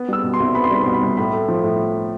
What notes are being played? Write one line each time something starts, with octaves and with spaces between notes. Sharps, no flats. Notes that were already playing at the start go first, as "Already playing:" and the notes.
Already playing: B3
G3 E6
B2
C6
C2
B3 B5
C6
G3 B5
B2 C6
B5
C2
A2 B5
A3
F3
A2